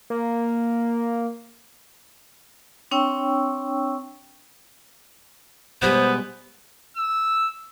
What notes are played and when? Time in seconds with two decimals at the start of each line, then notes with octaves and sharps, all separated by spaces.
0.10 A#3
2.91 C4 D4 C#5 G5 C#6 E6
5.82 B2 G3 G#3 B3 C5
6.96 E6